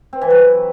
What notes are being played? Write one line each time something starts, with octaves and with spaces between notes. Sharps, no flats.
C4
E3
F#3